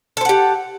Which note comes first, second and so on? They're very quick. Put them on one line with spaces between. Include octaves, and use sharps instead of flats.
A4 C5 F#5 G4